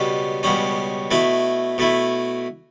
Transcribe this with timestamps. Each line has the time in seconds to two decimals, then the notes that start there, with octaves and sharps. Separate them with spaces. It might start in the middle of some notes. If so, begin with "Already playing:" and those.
Already playing: C#2 B2 G3 C#4
0.43 C#2 B2 G3 C#4
1.11 B2 A3 E4
1.78 B2 A3 E4